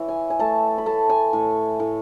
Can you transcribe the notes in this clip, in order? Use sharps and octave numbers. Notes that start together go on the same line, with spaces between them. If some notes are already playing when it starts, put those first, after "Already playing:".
Already playing: E3 C#5 E5
G#5
G#5
A3 A5
B5
A3 A5
G#5
A2
A2